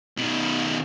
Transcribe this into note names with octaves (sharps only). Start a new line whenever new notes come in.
B2 D#3